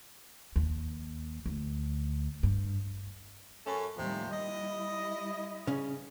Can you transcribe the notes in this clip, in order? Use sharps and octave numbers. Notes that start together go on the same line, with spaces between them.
D#2
D2
G2
F#2 C#4 A4
D#2 A2 C3 F3 G3
G3 E4 D#5
C#3 C#4